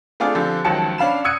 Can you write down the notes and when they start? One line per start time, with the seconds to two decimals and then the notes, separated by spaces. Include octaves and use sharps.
0.20 A3 C4 D4 F4 G#4 D5
0.35 D3 F3 C4 G4
0.65 C#2 D#3 F3 F#3 A5 C#7
0.98 C#4 D4 F5 B5 E7
1.24 D#6 E6 F#6 G#6 C#7 D#7